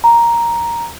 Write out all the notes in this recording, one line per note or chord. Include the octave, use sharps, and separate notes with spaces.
A#5